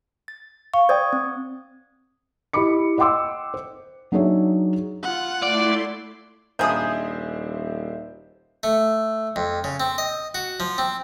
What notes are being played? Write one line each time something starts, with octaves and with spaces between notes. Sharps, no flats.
A6
F5 C#6
C5 D5 G5 D#6 G#6
C4
E4 G4 D#5 B5 D6 C#7
D#5 F#5 G5 C6 D6 E6
C5
F#3 D4 D#4 G#4 C#5 E5
F4 F#5
A3 E4 D5 C6
D#1 A#1 D#4 G#4 C5 E5 D#6 G6
A3
F2
C#3
C4
D#5
F#4
F3
C4